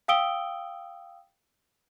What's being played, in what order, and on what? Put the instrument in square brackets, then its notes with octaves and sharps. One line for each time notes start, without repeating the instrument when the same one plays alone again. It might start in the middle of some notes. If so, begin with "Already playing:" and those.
[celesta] F5 G5 D#6 E6 D7 G7